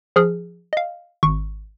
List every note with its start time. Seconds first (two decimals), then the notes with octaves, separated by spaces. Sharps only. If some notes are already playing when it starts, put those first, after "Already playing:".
0.16 F3 G#4 F6
0.73 D#5 F5
1.23 G#1 C#6